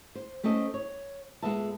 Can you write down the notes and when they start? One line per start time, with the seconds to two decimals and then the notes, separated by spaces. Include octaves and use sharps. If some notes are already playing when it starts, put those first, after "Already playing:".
0.15 C5
0.44 A3 C4 C#4 A4 D#5
0.74 C#5
1.42 A#2 G#3 B3 A4 E5 A5